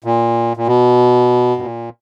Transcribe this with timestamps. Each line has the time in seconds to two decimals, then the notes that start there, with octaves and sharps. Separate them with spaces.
0.04 A#2
0.57 A#2
0.67 B2
1.57 G2
1.62 A#2